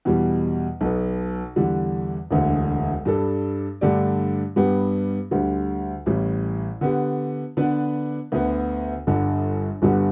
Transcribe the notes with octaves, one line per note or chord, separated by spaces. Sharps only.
E2 B2 G3
B1 B2 B3
E2 D3 G3 D4
E1 D2 D3
G2 G3 D4 A4
G2 D3 A3 G4 D5
G2 G3 B3 G4
D2 D3 G3
A1 A2 G3
D3 B3 G4
D3 B3 D4 B4
D2 D3 B3
G1 G2 D3
G1 G2 D3 G3 B3